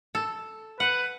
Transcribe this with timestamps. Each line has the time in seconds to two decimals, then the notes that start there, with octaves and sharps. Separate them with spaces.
0.15 A4
0.80 B4 F#5